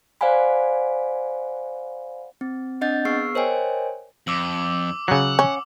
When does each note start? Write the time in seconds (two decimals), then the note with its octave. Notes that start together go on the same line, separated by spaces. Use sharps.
0.21 C5 D5 F5 F#5 G#5 B5
2.41 C4
2.81 C4 D4 D#5 F#5 G6 A6
3.05 B3 G#4 C#6 E6 F6 C7
3.35 A#4 C5 C#5 D#5 G5 G#5
4.27 F2 D6 E6 F#7
5.08 C#3 F#3 F#5
5.39 C#4